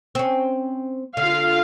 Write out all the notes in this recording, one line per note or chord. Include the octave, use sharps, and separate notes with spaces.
C4 C#4
D3 F4 F5